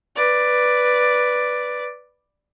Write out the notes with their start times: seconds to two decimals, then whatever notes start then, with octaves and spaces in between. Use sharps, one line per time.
0.16 B4 D5